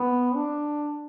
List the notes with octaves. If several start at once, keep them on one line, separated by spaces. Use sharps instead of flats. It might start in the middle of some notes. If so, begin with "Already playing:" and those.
Already playing: B3
D4